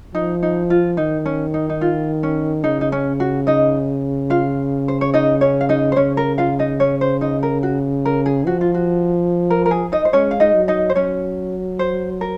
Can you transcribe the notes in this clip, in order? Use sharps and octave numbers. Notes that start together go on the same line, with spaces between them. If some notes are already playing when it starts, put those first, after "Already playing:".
F3 D#4
D#4
F4
D#3 D#4
C#4
D#4
D#4
F4
C#4
C#3 D#4
D#4
C#4
F#4
D#4 D#5
F4 F5
C5
C#5
D#4 D#5
C#4 C#5
F5
D#4 D#5
C5
C#3 C#4 C#5
A#4
F4 F5
D#4 D#5
C#4 C#5
C5
D#4 D#5
A#4
F#4
A#4
G#4
F3 F#4
F4
F#4
A#4
A#4
G#4
D#4 D#5
C5
G#3 C#4 C#5
F5
D#4 D#5
F#3
D#4 D#5
C5
F#3 C#4 C#5
C5
A#4